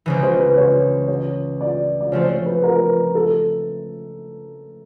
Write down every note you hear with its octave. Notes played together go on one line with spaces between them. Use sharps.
C#2 C#3 E3
C5
B4
C#5
C#5
D5
D5
C#3 F3 A3 C4 C#5
C5
B4
A#4
B4
A4